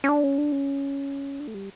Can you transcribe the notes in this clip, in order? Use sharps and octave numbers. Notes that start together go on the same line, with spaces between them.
C#4
D4
C#4
D4
C#4
D4
A3
G3